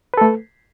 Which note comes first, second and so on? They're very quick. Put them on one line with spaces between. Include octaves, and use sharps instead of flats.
B4 A4 A3